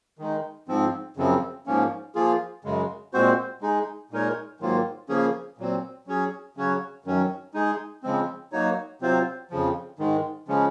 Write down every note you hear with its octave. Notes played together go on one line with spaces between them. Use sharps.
D#3 G#3 D#4
G#2 F3 C4
F#2 C#3 F3 C4
G#2 F3 A#3 C#4
F3 A#3 F4 G#4
F#2 C#3 G#3
A#2 G#3 C4 F#4 C5
G#3 D#4 G#4
A#2 G#3 D#4 A#4 C#5
G#2 D#3 F#3 A#3 F4
C#3 F3 A#3 C#4 G#4
A#2 F#3 C4
F#3 C#4 G#4 C#5
C#3 F#3 C#4 F#4 C#5
F#2 D#3 F#3 C#4
G#3 D#4 G#4
C#3 F3 G#3 C4
F#3 A#3 D#4 F#4 C#5
C3 F#3 C4 F4 C5
F2 C#3 F3
G#2 D#3 G#3
C#3 F3 G#3 C#4